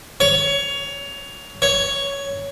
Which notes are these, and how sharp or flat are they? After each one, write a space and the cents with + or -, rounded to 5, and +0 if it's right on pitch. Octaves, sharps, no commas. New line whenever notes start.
C#5 +20
C#5 +10